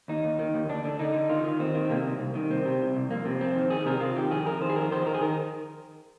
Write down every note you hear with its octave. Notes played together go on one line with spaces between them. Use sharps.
D#2 D#4
D#2
D#3
D#2
D2 D4
D3 D4
D3 D#4
D3
D#3 F4
D#3
D#2 C4
D#3
C3 A#3
C2
C2
D#3
C2 C4
C3
C2
C2
F2 A#3
C3 C4
F2 C4
D#3
D#3 G#4
C3 A#4
C3 F4
D#3 G4
F2 G#4
F2 A#4
D#3 C5
G#4
F2 A#4
D#3 C5
D#3 A#4
G#4
D#3 A#4